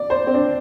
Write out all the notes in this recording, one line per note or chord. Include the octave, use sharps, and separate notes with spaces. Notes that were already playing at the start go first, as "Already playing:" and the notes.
Already playing: D5
C5
C4
D4